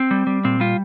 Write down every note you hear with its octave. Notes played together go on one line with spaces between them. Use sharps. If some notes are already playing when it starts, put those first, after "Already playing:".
Already playing: C4
G3
G3
A#2 C4
G3 F4